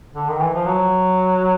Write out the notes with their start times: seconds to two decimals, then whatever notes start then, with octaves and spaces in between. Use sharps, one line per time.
0.15 D3
0.28 D#3
0.41 E3
0.54 F3
0.66 F#3